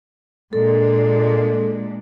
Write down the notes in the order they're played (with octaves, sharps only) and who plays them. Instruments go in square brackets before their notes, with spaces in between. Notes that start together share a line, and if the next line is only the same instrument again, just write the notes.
[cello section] A#2 G#3 D4 [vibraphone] A4